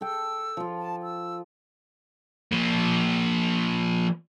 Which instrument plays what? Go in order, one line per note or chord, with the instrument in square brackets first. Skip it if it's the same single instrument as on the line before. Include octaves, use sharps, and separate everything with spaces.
[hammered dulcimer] A4 G5 [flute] E6
[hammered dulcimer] F3 F4
[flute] A5
E6
[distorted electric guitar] F3 A#3